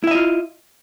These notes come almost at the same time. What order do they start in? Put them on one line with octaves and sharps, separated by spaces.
E4 E5 D#5 F4